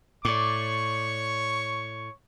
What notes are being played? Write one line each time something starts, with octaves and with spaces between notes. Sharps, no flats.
A2 C#5 D5 C#6 D6